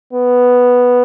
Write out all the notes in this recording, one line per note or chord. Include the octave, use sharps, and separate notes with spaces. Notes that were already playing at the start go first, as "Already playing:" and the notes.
B3